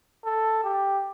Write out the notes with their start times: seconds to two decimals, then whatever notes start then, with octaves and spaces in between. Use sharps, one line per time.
0.24 A4
0.63 G4